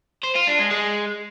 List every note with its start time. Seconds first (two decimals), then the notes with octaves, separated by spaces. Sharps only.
0.24 C5
0.36 F4
0.48 D4
0.59 G#3
0.71 G#3